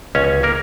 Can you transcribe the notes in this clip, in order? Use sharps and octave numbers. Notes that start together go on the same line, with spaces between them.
C#2 C#4 C#5
G#4
A#3 A#4